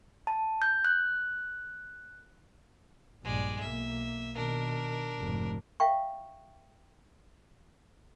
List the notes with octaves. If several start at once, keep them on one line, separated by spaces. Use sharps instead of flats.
A5
G6
F#6
A#1 G2 G#3 D5
B1 A#3 E5
B2 D#3 D4 A#4
F1 G#2
E5 F5 G5 C#6